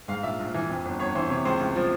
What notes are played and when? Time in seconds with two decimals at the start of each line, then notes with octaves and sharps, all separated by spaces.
0.08 G#2 F5
0.23 A#1 E5
0.39 A#1
0.54 E3
0.69 F2
0.85 G1
0.99 G1 C#5
1.15 E3 C5
1.30 C3 C#5
1.45 C#2 C5
1.60 C#2
1.76 F3